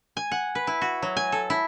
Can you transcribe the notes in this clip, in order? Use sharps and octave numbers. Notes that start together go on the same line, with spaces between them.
G#5
F#5
B4
E4
F#4
F#3
G#5
A4
E4